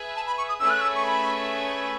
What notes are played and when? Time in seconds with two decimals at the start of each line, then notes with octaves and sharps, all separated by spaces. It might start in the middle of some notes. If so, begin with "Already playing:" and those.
Already playing: G#4 B4 E5
0.16 A5
0.27 B5
0.38 C#6
0.49 D#6
0.59 A3 C#4 G#4 B4 E5 E6
0.70 F#6
0.81 E6
0.95 C#6
1.04 B5